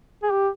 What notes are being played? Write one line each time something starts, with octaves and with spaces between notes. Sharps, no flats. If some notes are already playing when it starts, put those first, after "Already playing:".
G#4
G4